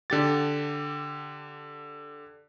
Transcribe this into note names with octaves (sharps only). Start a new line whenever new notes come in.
D3 G4 A6